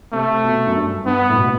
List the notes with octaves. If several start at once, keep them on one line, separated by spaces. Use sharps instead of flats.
C3 A3
B2
F#2
G2
G2 B3
A2
B2
A2